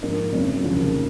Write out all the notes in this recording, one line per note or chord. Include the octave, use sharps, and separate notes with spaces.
G#2 F3 A#3 D#4
F#1 F2 C#3 F#3
F1 D#2 C#3 F3 A#3